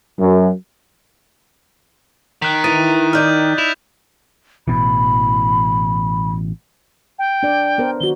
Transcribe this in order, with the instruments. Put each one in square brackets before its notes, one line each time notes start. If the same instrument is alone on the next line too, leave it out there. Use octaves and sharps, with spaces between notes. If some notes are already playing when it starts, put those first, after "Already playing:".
[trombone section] F#2
[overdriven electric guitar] D#3 [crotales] F#6 B6
[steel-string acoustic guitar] E3 [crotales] D#6 A6 D#7
[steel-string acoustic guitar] D#4 D5 [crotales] F6 G6 D#7
[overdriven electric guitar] E4 [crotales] E7 F7
[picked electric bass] A1 B2 E3 [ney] B5
[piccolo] G5
[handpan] D4 D5
B3 A#4 C5
[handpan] D#3 F#4 [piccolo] G7